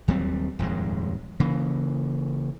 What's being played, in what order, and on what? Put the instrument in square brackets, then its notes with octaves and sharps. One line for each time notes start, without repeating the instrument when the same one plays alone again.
[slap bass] D#2 F#3 G3 C4
D#1 F2 G#2 G#3
C#3 E3 A#3